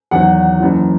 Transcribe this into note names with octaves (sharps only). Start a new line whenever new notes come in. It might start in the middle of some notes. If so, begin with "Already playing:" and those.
E2 D#3 F#3 F#5
F#1 F#2 E3